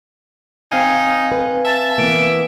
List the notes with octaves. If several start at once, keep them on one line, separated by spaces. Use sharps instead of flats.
C4 D#4 F5 G#5
B4
E5 A5
E3 A#3 B3 D7